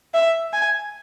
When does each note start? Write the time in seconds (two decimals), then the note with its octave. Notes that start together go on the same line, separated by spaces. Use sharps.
0.14 E5
0.53 G#5